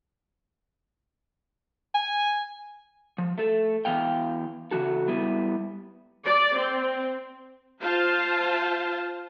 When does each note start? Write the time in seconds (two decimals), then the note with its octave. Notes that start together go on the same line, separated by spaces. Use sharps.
1.94 G#5
3.18 F3
3.38 A3 A4
3.85 E3 B3 F5 G5
4.71 C#3 E3 F#4 A4
5.08 G3 B3 E4
6.25 D5
6.56 C4
7.81 F4 C5 F5 A5